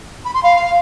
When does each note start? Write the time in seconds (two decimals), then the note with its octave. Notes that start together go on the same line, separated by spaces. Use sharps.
0.24 B5
0.34 C6
0.43 F5